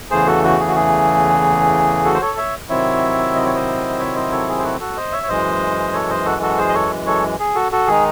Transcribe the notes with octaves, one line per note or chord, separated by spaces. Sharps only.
E2 C#3 E3 A3 G#4 C5
F#4 A4
F#4
G#4
F#4
G#4
F#4 A4
C5
A4 C#5
C#5 E5
C3 D#3 F#3 C4 E4 C#5 E5
D#5
C#5
C5 D#5
C#5 E5
C5 D#5
A4 C#5
G#4
C5
F#4 A4
F#4 A4
C5 D#5
C#5 E5
C#5
F#2 E3 G#3 C5 D#5
A4 C#5
C5 D#5
F#4 A4
F#4 A4
G#4 C5
D#5
A4 C#5
A4 C#5
G#4
F#4 A4
F#4 A4
D#3 G#3 D#4 G#4